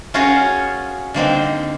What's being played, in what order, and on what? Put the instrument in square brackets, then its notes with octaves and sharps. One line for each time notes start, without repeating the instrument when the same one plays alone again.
[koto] C#4 F4 F#4 G#4 A#4 C#5
D3 A#3 C4 D#4